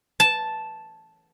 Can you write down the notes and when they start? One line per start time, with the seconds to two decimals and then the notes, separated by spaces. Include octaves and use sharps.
0.20 A5